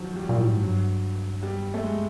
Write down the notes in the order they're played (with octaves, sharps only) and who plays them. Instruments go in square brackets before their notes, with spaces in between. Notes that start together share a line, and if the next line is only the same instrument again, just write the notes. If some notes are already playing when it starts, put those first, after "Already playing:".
Already playing: [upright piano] D#3 F3 F#3
G3
F#3
[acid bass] A#2
A2
G#2
[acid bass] G2 [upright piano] F#3
[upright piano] G3
A3
G#3